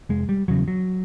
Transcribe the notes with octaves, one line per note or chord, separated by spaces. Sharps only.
F1 G#3
G3
E2 C#3 F#3
F#3